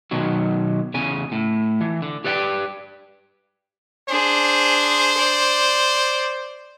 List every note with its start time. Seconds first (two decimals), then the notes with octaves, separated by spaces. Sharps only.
0.11 B2 D#3 F#3
0.94 E2 C#3 G#5
1.32 A2
1.81 E3
2.02 D3
2.24 G4 B4 D5 F#5 G5
4.09 D4 G#4 C5
5.17 D5